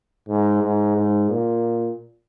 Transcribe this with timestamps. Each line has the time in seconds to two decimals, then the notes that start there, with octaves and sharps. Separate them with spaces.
0.28 G#2
0.63 G#2
0.96 G#2
1.30 A#2